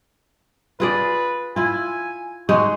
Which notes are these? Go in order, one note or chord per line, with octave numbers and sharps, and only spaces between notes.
F4 G#4 B4 D5
E4 F4 G#5
G#3 D#4 F#4 G#4